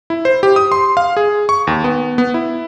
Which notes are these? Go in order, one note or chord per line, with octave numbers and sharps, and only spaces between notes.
E4
C5
G4
D#6
C6
F5
G#4
C#6
D#2
B3
B3
E4